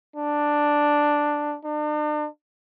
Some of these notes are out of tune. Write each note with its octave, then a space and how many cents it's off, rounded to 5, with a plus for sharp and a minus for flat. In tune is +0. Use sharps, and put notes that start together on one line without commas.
D4 +5
D4 +40